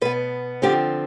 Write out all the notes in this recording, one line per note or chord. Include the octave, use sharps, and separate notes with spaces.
B2 B3 B4
D3 F3 C4 G4